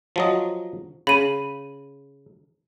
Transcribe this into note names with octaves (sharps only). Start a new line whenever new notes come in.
F3 F#3 D#5
C#3 B5 D#7